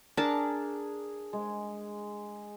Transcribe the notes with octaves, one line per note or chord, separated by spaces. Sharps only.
D4 G#4 A#4 A5
G#3